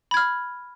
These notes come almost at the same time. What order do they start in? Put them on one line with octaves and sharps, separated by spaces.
B5 G#6 F6